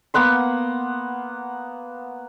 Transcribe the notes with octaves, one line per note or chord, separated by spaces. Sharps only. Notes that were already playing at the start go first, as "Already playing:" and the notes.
A#3 B3 F#5 C6